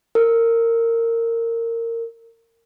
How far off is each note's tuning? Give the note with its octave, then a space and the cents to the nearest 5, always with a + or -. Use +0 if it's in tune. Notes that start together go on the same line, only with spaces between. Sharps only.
A#4 -20